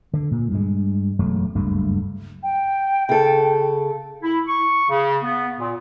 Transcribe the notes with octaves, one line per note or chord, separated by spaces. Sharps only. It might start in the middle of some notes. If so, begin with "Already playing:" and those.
D3
A#2
G2 G#3
E1 F#2 F#3 A3
F#1 D2 G2 A3
G5
C#3 A4
E4
C#6
C#3
B3
A#2